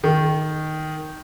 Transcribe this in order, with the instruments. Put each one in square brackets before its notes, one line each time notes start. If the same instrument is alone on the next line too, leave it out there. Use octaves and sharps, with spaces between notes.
[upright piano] D#3